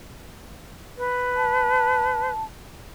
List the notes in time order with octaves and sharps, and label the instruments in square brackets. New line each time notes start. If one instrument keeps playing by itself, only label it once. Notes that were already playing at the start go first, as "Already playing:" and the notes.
[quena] B4
[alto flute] A5